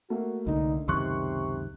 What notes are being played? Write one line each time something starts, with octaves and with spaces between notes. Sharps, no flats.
A3 A#3 F#4
C2 D3 D#4
C#2 F#2 C3 D#3 C6 C#6 F#6